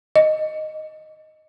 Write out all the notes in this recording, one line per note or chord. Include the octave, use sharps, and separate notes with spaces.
D#5